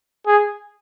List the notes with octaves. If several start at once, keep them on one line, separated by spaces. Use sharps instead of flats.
G#4